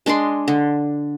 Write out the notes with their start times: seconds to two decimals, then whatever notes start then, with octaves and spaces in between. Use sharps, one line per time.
0.06 G#3 D4 D#5 C6
0.48 D3